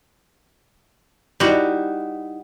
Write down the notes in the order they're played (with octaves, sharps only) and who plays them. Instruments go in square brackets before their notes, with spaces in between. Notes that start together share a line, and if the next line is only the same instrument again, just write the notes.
[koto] G3 F#4 [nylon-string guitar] D#4 E4